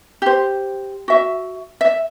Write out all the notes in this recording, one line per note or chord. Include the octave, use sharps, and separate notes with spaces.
G4 C5
F#4 E5
E5